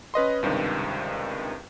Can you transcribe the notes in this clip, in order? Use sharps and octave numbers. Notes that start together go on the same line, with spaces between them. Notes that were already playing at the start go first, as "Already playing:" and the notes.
C#4 B4 D#5 C6
C#2 G2 C3 D#3